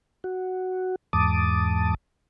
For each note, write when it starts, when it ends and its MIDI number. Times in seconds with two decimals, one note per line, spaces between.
0.24 0.96 66
1.13 1.94 40
1.13 1.94 44
1.13 1.94 81
1.13 1.94 86
1.13 1.94 87